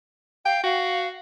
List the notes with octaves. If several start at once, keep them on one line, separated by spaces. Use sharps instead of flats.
F5 G5
F#4 F5